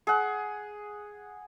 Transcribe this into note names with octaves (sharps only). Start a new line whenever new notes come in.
G#4 F#5